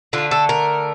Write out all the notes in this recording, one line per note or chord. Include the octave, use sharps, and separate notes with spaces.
D3 A3 F4
A4
A#4